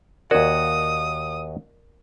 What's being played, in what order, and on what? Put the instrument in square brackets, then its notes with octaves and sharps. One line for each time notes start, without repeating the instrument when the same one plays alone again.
[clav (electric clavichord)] D#2 F#4 [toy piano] A#4 D5 [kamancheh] D#6